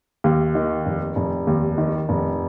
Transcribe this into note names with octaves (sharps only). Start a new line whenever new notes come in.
D#2
D#3
F1
F1
D#2
D#3
F1